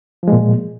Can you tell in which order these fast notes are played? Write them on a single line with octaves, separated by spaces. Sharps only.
F3 G#3 A#2